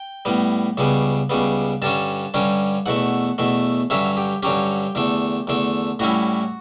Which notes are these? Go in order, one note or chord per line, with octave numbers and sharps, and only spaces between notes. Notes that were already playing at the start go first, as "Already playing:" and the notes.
Already playing: G5
A2 G3 B3
C#2 C#3 G3 B3
C#2 C#3 G3 B3
G2 D3 G3 C#4 A5
G2 D3 G3 C#4
E2 B2 A3 F#5
E2 B2 A3
G2 D3 F#3 C#4 E5
G4
G2 D3 F#3 C#4 G4
E2 D3 A3
E2 D3 A3
A2 G3 C#4 E4 F#4